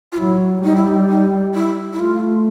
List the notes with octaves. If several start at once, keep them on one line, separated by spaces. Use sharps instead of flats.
F4
F#3 E4
G3 D#4
E4
D#4
D#4
E4
E4
A3 F4